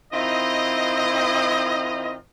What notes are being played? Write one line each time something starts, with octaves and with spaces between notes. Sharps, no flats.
D#3 C4 E4 F4 D#5